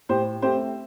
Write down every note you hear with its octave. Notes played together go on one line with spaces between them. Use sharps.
A2 G4 C5
A3 C4 G4 C5